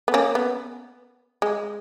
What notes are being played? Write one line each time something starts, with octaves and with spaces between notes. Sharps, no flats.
B3
A#3 C#4
B3
G#3